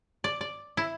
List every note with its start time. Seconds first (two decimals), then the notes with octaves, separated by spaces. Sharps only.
0.24 D5
0.41 D5
0.77 E4